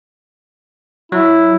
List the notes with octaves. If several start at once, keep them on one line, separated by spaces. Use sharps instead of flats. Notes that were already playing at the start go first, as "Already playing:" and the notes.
F#3 E4